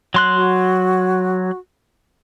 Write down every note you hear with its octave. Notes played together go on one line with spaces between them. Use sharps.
F#3 C6 F#6
F#4